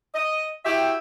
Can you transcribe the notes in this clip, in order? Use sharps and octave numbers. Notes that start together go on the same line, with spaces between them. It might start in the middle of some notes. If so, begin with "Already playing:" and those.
D#5
E4 F#4 G4 E5 G5